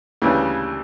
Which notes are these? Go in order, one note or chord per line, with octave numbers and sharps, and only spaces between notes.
D2 C#3 E3 G3 D4